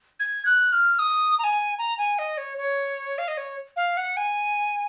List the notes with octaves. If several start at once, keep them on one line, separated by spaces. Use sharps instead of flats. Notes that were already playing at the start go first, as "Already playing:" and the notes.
G#6
F#6
F6
D#6
A#5
G#5
A#5
G#5
D#5
C#5
C#5
F5
D#5
C#5
F5
F#5
G#5